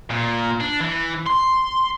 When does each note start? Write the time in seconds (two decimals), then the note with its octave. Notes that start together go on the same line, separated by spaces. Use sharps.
0.11 A#2
0.60 D4
0.81 E3
1.27 C6